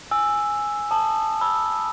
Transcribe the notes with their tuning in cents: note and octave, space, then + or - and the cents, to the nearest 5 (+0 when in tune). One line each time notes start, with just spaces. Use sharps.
G#5 +0 E6 +0
A5 +0 D#6 -20
B5 -25 E6 +0